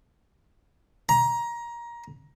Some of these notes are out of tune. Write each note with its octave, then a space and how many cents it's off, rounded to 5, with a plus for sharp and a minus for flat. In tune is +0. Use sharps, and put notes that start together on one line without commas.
A#5 +20